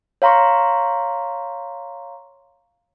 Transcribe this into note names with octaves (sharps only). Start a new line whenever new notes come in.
C#5 F5 A#5 C6 C#6